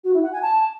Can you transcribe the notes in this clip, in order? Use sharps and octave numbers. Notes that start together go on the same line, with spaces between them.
F#4
E4
F#5
G#5
A5